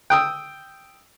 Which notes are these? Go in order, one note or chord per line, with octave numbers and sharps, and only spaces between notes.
G5 D#6 E6